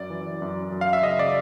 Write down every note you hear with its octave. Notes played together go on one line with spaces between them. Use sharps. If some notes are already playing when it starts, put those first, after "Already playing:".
Already playing: F#2 D5
E3
F#2
F#2
F5
E5
C#3 D#5
D5